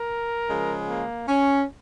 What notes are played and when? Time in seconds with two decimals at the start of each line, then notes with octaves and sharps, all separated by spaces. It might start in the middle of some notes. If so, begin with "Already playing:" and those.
Already playing: A#4
0.49 C#3 F3 G#3
0.89 A#3
1.28 C#4